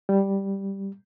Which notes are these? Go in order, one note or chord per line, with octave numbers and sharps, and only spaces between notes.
G3